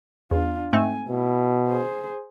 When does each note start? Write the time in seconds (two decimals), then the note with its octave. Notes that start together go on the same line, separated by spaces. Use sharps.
0.31 E2 D4 F4
0.73 G#2 A3 C4 G#5
1.09 B2 E4
1.68 G#4 C5